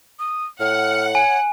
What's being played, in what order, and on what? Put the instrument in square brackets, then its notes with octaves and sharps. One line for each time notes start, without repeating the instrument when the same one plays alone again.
[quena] D#6
[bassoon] A2 [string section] F#5 [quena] F6
[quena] C#5 [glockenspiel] G#5